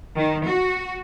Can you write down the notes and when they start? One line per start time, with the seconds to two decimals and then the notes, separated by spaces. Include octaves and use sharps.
0.16 D#3
0.47 F#4